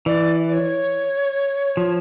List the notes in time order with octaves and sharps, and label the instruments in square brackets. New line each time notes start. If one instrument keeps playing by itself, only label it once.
[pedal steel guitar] E3 [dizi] D5
[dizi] D5
C#5
[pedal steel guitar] F3